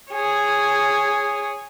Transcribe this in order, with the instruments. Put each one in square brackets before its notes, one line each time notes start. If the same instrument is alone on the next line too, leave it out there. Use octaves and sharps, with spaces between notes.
[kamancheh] G#4 C#5